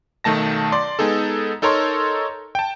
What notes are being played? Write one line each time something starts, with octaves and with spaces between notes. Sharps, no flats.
B1 D#3 A3 A5 A#6
D5 C6
G#3 B3 D#4 G#4 A4
D#4 A4 A#4 C#5 A#5 C6
G5 A5